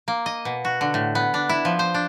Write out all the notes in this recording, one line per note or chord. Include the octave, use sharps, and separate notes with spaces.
A#3
D#5
B2
F#4
D3
A2
B3
D4
E4
F3
C5
D4